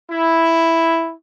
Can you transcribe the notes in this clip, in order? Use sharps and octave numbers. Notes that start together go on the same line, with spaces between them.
E4